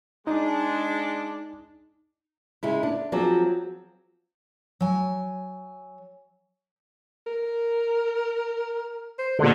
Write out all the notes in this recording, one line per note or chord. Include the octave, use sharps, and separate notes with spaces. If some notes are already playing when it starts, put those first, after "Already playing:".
G#3 D4 D#4
C#3 G#3 E4
D4
F3 F#3 C4 G#4 D5
F#3 G#5
A#4
C5
A#2 D3 G#3